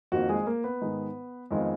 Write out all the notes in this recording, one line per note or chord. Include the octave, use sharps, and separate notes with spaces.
F2 D#3 A#3 F4 F#4
G#3 G#4
A#3 A#4
B3 B4
G#2 D#3 G#3 D#4
F2 D#3 G#3 B3 F4